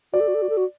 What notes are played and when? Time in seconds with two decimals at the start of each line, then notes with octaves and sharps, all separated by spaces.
0.13 F#4 D5
0.20 A4
0.28 F#4
0.35 A4
0.42 F#4
0.49 A4
0.57 F#4